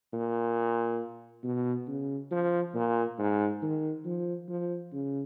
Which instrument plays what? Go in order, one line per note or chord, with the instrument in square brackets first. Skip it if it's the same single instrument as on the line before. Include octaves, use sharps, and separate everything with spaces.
[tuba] A#2
B2
C#3
F3
A#2
G#2
D#3
F3
F3
C#3